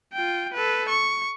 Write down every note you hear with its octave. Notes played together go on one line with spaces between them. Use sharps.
F4 G5
A4 B4
C#6